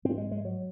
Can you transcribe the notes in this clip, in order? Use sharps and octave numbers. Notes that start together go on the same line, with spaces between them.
G#2 C4
G#3
G#3
F#3